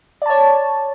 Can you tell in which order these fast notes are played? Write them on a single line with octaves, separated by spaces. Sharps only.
D5 A5 C#5